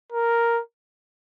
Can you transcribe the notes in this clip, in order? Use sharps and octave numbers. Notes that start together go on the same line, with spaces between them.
A#4